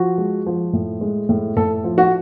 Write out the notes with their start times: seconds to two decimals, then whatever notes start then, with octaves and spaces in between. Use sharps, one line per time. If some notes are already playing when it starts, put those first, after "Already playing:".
Already playing: F3 F#4
0.18 G#3
0.46 F3
0.73 A2
1.01 G#3
1.29 A2
1.57 A2 A4
1.84 F3
1.98 F#4